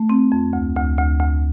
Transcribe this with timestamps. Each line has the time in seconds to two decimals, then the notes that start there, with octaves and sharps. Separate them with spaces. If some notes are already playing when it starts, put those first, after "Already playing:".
Already playing: A3
0.09 C4
0.32 F2
0.53 D2
0.76 D2
0.98 D2
1.20 D2